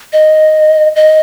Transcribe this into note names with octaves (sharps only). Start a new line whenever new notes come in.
D#5
D#5